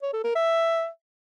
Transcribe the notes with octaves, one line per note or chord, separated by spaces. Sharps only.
C#5
A4
A#4
E5